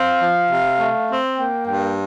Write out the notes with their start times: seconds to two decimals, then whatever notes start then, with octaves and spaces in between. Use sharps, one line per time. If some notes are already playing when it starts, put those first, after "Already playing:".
Already playing: C4 F5
0.21 F3
0.51 C3
0.80 A3
1.10 C4
1.38 A#3 G5
1.67 G2 G5